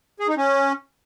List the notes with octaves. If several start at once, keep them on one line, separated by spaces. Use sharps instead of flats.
G#4
D#4
C#4